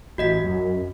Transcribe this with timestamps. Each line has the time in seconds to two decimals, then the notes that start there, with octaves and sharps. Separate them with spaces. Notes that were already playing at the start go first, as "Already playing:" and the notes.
0.18 A1 F#4 D#5 B6
0.44 F#2